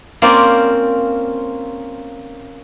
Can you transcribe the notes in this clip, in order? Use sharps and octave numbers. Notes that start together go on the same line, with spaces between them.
A#3 C4 C#4 F4 C5 D5